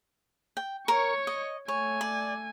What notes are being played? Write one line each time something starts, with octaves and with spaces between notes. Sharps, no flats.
G5
A#4 C#5 C#6
D#5
A3 C#5 G#5
D5